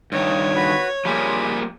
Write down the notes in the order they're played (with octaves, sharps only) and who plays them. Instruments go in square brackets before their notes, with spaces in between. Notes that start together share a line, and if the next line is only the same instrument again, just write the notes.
[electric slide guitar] G2 D#3 [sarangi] C#5
[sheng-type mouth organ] F#4 B4 B5
[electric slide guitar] F3 G3 A#3 [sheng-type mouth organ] G#4 B5